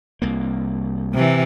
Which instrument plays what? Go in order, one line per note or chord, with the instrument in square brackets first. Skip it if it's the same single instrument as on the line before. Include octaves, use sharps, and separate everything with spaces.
[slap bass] C2 A#3
[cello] C3 E3